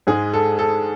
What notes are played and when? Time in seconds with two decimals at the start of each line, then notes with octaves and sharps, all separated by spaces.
0.07 G#2 G#3 G#4
0.34 A4
0.59 A4